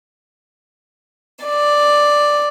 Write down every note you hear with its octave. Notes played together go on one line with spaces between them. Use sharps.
D5